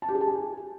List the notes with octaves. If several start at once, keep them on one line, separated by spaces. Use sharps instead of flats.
A5
G4
G#4
A5
G#5